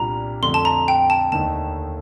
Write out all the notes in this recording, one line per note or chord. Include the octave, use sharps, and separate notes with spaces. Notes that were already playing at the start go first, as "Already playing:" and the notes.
Already playing: C2 A#2 G3 D4 A#5
F2 D3 A3 C6
A5
A#5
G5
A5
D#2 D3 A3 D#4 A5